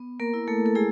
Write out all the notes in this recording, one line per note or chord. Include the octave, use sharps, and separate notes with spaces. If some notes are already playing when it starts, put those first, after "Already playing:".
Already playing: B3
A#3 A#4
E4
A3 A4
A4
G#3 E4 G#4